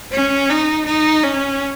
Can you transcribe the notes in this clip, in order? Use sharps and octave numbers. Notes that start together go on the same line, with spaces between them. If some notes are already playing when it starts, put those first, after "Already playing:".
C#4
D#4
D#4
C#4